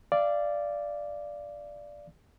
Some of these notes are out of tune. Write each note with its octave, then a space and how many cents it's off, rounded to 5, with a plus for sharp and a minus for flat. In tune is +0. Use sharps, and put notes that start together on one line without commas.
D5 +0 F5 -25